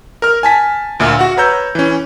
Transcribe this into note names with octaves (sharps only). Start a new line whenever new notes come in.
A#4 F6
G#5 A5 B6
D2 A#2 E5 F6
F#4 F#5
B4 C#5 A#5 E6 G6
E3 C#4